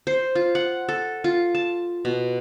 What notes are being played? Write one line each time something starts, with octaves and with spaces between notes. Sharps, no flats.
C5
F4
F#5
A4
F4
A5
B2